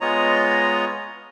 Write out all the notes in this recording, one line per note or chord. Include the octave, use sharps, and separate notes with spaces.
G#3 B3 F4 C#5 D#5 A#5